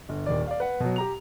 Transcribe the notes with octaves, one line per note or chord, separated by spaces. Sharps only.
G1
D#1 D#2 D5
D5 F5
B4 F#5
B2 F#3
G4 A#5 F7